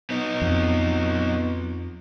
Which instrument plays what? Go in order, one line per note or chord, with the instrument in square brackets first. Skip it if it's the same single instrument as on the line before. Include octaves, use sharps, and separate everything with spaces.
[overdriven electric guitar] B3 D#4
[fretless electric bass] F2